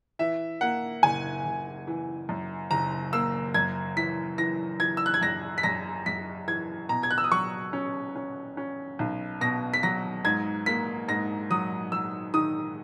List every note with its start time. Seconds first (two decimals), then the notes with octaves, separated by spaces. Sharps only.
0.19 E3 E5
0.61 A#3 F#5
1.03 F#1 G#5
1.45 F#1
1.87 E3
2.29 F#2
2.71 F#1 A#5
3.13 A#3 E6
3.54 F#2 G#6
3.97 E3 B6
4.38 E3 A#6
4.80 E3 G#6
4.97 E6
5.06 F#6
5.14 G#6
5.22 F#2 A#6
5.58 B6
5.63 F#2 A#6
6.06 F#2 B6
6.48 E3 G#6
6.89 B2 A#5
7.03 G#6
7.11 F#6
7.18 E6
7.24 D#6
7.31 F#3 C#6
7.73 C#4
8.16 C#4
8.57 C#4
8.99 B1
9.41 B2 A#6
9.74 B6
9.83 F#3 A#6
10.24 G#2 G#6
10.66 A#3 B6
11.08 G#2 A#6
11.50 F#3 D#6
11.92 F#3 E6
12.34 D#3 D#6